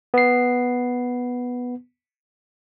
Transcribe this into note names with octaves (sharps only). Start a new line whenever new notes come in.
B3 C7